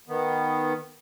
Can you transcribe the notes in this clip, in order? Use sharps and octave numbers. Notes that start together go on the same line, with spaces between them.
D#3 B3